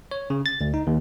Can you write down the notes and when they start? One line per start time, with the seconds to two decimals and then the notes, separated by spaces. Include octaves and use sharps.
0.11 C#5
0.30 C#3
0.46 A6
0.61 D2
0.74 D#4
0.87 D#2